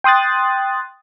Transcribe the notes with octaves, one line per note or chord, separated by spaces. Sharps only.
G5 C6 D#6 F#6 A6